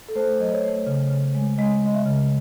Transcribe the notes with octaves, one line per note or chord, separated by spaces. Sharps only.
A4
A3 C5
F#3 D#5
C#5
A3
C#3
C#3
G#3
G#3 D#5
G#3 D#5
E5
C#3